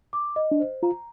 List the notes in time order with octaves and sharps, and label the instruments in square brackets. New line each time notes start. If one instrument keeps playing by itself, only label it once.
[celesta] D6
D#5
[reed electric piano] D4
[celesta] C5
[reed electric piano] F4 [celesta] A#5